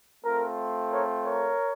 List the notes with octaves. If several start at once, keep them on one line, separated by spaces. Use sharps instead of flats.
A3 C4 F4 A#4
A#4 C#5
A#4 C#5